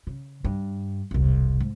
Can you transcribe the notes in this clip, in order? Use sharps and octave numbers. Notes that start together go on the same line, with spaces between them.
C#3
G2
E1 C2
G#2